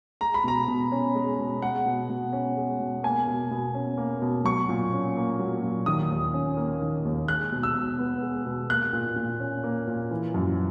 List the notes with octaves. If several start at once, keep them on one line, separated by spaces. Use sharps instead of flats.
G#3 A#5
B5
B2 A#5
B2
C#4
G#3
B2
G#3 F#5
B2
B2
C#4
G#3
B2
A#3 G#5
B2
B2
C#4
A#3
B2
F#3 C#6
A#2
C#4
A#3
F#3
A#2
D#3 D#6
D#2
C#4
A#3
D#3
D#2
G#3 F#6
B2
E6
B2
B3
G#3
B2
A#3 F#6
A#2
A#2
C#4
A#3
A#2
E3
F#2